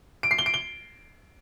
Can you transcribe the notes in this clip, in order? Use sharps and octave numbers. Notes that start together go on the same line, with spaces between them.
D7
C7
G7
D7
G7